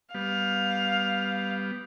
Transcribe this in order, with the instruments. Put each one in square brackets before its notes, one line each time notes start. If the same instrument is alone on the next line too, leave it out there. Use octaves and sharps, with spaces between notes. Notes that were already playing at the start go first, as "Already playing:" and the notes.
[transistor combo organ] G3 B3 [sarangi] F5